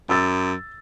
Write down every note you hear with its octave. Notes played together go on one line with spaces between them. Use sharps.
F#2 E6 A6